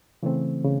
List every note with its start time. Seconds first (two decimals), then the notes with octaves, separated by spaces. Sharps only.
0.23 C#3 E3 A3 C4
0.64 C#3